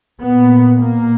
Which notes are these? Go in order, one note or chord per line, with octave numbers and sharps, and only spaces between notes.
A#2 B3
A#3